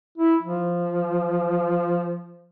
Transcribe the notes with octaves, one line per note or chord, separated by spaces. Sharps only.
E4
F3